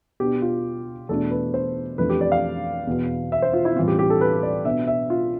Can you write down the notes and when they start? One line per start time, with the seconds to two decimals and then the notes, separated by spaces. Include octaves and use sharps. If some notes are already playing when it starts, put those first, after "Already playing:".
0.20 B2 B3 D4 G4
0.42 F4
1.09 E2 B2 A3 D4 A4
1.31 B4
1.54 C5
1.98 F2 E3 A3 D4 B4
2.10 G4
2.21 D5
2.32 F5
2.87 E2 B2 B3
3.32 E5
3.42 C5
3.53 F4
3.65 E4
3.76 A2 E3 G3 C4 F4
3.88 G4
3.99 G4
4.10 A4
4.21 B4
4.43 D5
4.65 B2 B3 D4 E5
4.87 E5
5.10 F4